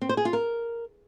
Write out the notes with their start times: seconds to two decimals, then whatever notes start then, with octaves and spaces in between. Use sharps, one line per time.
0.01 C4
0.09 C5
0.17 G#4
0.25 F4
0.33 A#4